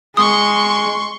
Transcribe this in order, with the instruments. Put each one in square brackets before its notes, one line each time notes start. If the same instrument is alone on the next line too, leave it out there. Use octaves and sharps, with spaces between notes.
[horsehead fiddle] G#3 [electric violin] C6 C#6 [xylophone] D#6